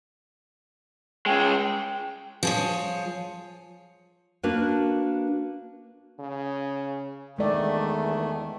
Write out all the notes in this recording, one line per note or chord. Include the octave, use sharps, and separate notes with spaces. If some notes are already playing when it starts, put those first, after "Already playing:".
C#3 G#3 G5
F3 G#4 C#5
A#3 D4 F#4 A#4 B4
C#3
E2 D#3 G#3 A3 D5